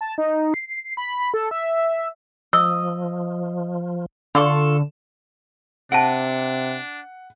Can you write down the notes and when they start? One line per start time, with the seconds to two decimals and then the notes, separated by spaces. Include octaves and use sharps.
0.01 A5
0.18 D#4
0.54 C7
0.97 B5
1.34 A4
1.51 E5
2.53 F3 D#5 E6
4.35 D3 F4 A4 C#6
5.92 C3 D4 F#5 A5 A#6 D7